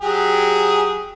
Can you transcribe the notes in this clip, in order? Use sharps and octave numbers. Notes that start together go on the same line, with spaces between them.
F#3 G4 G#4